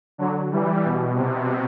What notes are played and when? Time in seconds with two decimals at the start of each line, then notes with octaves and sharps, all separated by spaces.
0.18 D3 F#3
0.51 E3 G3
0.84 B2
1.16 C3